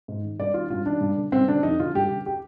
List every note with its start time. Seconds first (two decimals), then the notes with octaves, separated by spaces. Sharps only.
0.08 G#2
0.24 D#3
0.39 G2 D5
0.54 D#3 F4
0.70 G2 F4
0.86 D#3 D4
1.01 G2
1.17 D3
1.32 G2 C4
1.48 D3 D4
1.63 F2 D#4
1.79 D3 F4
1.95 G2 G4
2.10 D3
2.26 G4